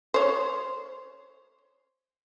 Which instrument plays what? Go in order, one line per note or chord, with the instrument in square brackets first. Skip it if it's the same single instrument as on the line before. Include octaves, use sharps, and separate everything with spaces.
[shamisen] C5 C#5